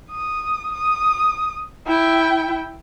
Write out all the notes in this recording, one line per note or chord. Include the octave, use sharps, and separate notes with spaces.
D#6
D#6
E4 G5